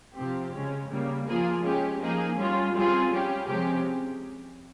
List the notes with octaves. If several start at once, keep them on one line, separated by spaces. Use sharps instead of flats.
C3 F3 C4 G4
C#3 G#3 C#4
C#3 G3 A#3
F3 A#3 F4 G#4
G#3 C#4 G4
F3 A#3 D#4 G#4
G3 C#4 F4 G#4
G3 C4 F4 G#4
G3 C#4 G4
C3 F3 G#3 C#4 G4